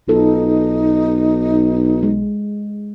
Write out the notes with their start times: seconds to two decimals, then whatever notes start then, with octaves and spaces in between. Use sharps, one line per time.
0.08 B1 D#4 F4 A4
2.03 G#3